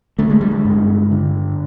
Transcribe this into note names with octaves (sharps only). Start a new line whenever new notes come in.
D3 A3
G#3
G3
G#3
G2
D3